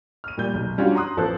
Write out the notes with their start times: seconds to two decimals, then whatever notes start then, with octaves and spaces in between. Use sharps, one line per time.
0.24 F6 D#7
0.38 A#2 G3 G6
0.54 B1
0.78 G3 C#4 D4 F4 F#4
0.95 A#5 C6 D#6 F#6
1.17 A1 F3 B3 A4 C5 F#6